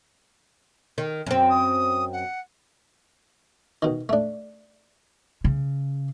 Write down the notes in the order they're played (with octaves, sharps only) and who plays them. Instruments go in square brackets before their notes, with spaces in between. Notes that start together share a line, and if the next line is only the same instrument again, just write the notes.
[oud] D#3
F#2 C4
[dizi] D#6
F#5
[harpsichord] B2 D#3
A3 D4
[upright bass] C#3